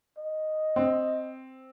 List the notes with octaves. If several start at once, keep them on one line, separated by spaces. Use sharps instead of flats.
D#5
C4